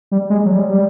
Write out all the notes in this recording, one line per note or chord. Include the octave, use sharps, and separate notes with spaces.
G3
G#3
F#3
G3
G3